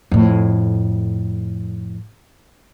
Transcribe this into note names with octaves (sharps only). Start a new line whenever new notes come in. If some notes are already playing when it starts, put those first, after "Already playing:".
F2 A2